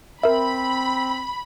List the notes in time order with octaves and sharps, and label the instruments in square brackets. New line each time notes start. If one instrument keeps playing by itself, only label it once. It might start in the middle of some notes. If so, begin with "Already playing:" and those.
[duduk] C4 [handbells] A#4 E5 [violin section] B5